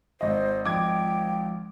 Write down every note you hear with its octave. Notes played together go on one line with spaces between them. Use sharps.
G#1 C5 D#5
F3 G5 D6 G#6